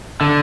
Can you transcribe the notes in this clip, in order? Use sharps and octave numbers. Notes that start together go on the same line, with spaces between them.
D3